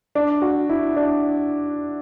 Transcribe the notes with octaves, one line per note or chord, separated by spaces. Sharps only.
D4
F#4
E4
D4